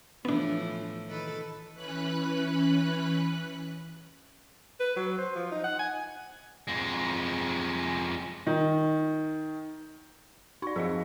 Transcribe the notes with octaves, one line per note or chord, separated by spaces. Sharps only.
A2 E3 F3 B3 D4
D#3 A4 B4
E3 C#4 B4 B5 F#6
B4
F#3
C5
F3
D#4
F#5
G#5
F2 G#3
D#3
D#4 D5 C#6
F2 G#4 D#5 F5